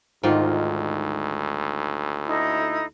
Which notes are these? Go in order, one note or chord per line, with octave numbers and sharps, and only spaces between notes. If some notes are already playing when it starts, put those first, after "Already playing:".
D2 G#2 D#3 F4
D#4 E4 A4